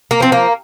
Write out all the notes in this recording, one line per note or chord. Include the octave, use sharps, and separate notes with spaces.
A#3
F3 C4
A#3